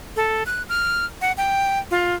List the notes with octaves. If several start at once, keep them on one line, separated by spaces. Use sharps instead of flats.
A4
F#6
F6
F#5
G5
F4